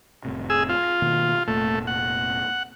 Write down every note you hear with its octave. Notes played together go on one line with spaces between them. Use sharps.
F1 A2 C3
G#4 E6
F4
B2 D#3 A#3
F1 A#2 A3
F#5